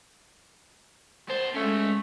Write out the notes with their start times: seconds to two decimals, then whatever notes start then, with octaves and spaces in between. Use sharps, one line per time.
1.30 B3 C5 A5
1.56 G#3 A3 C#4